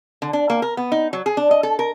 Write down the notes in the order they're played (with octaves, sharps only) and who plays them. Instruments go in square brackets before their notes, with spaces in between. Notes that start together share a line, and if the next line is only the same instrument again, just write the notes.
[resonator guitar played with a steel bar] D3
D4
A#3
A#4
B3
D#4
F#3
G#4
D4
D#5
A4
A#4